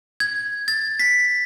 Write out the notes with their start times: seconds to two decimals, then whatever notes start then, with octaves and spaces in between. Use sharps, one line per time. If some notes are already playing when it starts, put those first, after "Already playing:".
0.20 G#6
0.68 A6
0.99 B6